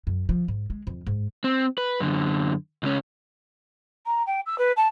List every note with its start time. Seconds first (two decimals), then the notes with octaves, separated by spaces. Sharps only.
0.07 F#2
0.29 F3
0.48 G#2
0.70 G#3
0.87 F2
1.07 G#2
1.44 C4
1.78 B4
2.00 F#2 D3
2.83 C#2 C#4
4.06 A#5
4.26 G5
4.46 E6
4.58 B4
4.76 A5